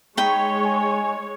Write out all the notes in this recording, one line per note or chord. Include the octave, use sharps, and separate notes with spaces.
G#3 D#4 C#5 G5 B5
G#5